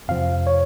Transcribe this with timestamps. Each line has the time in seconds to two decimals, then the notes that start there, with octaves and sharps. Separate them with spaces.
0.08 F2 C3 F3 F5
0.47 C#5